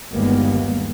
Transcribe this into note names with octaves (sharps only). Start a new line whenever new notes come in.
G1 D#2 G3 G#3 A#3 B3